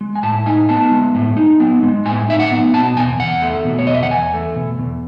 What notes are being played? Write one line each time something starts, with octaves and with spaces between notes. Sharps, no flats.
G#3
G#5
A2 A5
D#4 G#5
B3 A5
G#3
A2
D#4
B3
G#3
A2 G#5
D#4 E5
F#5
B3
B2 A5
E2 G#5
E2 F#5
A3
B2
C#5
E2 D#5
E5
F#5
E2 G#5
A3
B2
E2